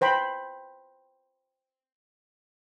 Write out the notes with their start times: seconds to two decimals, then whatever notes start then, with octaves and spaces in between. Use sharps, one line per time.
0.01 B4 C5 G5 B5